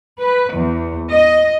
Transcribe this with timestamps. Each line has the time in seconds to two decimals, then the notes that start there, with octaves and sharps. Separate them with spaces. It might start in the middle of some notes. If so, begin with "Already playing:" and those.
0.19 B4
0.52 E2
1.09 D#5